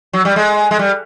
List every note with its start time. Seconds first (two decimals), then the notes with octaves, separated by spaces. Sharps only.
0.13 F#3
0.25 G3
0.36 G#3
0.71 G#3
0.79 G3